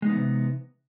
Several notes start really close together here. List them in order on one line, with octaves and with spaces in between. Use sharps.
G#3 D#4 B3 E3 C3